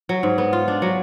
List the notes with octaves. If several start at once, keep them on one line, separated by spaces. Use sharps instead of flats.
F#3
G#2
B3
F4
D4
F#3